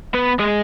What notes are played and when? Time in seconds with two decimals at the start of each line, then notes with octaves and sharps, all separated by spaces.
0.14 B3 B4
0.39 G#3 G#4